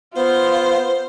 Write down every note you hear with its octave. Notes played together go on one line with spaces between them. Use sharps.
B3 F4 C5